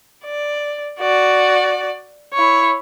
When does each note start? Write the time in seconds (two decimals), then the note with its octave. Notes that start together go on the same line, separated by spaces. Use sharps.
0.24 D5
0.99 F#4 D5
2.34 E4 C#5